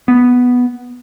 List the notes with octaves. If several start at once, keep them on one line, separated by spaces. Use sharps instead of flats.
B3